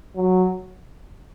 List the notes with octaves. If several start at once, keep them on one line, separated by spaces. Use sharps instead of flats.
F#3